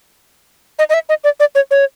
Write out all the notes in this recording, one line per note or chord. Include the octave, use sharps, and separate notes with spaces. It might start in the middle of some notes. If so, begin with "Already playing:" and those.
D#5
D#5
E5
D#5
D5
D5
C#5
C#5